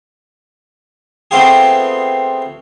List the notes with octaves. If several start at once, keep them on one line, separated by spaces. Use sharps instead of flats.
A3 B3 C4 F4 G4 G#4